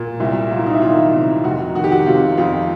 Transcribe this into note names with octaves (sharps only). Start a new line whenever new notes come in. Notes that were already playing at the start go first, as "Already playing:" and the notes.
Already playing: A#2
C2 E4
F#3 F4
E4
D#4
E4
D#3 F4
C3
F1 F#4
D#3 F#4
G4
F#4
C3 F4
F2 F4